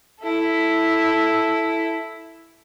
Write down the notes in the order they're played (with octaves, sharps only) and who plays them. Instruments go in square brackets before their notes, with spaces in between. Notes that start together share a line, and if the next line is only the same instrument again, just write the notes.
[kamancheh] E4 A4